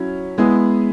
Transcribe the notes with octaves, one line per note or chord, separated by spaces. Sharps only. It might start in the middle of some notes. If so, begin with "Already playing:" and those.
Already playing: F#3 C#4 E4
G#3 B3 E4 G#4